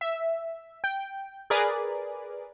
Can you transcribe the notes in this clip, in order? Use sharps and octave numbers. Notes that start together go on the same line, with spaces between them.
E5
G5
G#4 A#4 B4 D5